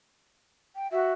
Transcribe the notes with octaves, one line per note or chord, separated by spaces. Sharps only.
G5
F#4 E5